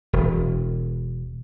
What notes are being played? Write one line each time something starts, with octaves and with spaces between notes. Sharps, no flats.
E1